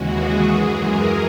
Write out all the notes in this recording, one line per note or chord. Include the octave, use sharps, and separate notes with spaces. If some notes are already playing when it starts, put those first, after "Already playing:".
Already playing: D#2 C#3 E3 G#3 F#4
G#4
F#2 E3 G#3
A#4